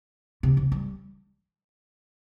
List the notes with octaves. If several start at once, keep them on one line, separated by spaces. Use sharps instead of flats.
C3
C3
G3